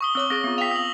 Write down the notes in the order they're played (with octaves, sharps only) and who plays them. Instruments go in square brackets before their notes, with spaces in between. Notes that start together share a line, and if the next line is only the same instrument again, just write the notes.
[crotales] C#6 D#6 G7
[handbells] C4 C#5 D6 [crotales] E6
[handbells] C4 G#4 A6 [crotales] A#6
[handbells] B3 C4 F4
[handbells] F5 G5 [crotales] B6 F7
[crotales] D#6 F#7